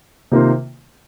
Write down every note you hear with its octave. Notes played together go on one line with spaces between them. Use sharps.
C3 D#3 A#3 F4 C5